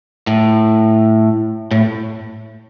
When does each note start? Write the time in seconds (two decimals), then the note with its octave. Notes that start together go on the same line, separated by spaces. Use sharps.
0.27 A2
1.71 A2